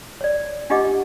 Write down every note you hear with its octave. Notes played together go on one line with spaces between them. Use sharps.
C#5 D5
D4 F4 G4 D#5 F#5 D6